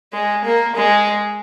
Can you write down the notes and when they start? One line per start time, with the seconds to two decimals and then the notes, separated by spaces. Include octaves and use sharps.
0.13 G#3
0.45 A#3
0.76 G#3